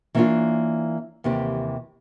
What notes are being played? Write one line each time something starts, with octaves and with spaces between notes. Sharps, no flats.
E3 A#3 B3 C#4 D4 F4
D#2 C3 E3 G4